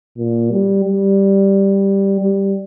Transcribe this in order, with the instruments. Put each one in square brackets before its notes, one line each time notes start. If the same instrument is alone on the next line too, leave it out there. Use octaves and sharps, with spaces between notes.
[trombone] A#2
G3
G3
G3